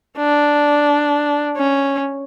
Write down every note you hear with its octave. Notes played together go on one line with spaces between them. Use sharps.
D4
C#4